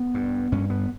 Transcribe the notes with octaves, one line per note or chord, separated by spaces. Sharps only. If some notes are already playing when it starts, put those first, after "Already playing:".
Already playing: B3
G2
G2 C#4
B3